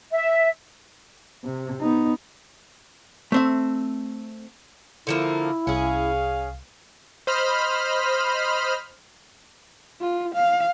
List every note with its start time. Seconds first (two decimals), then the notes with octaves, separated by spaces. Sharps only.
0.11 E5
1.45 C3
1.81 B3 D#4
3.32 A3 C4 E5
5.07 D3 F3 A#3 E4
5.67 C2 C#4 G#4 F5
7.27 C5 D#5 B5 F6
10.01 F4
10.35 F5